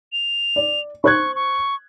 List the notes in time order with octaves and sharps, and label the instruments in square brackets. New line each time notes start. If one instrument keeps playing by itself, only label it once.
[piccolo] F7
[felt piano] D5
[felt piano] C5 F#6 G#6 [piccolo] C#6
[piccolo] C#6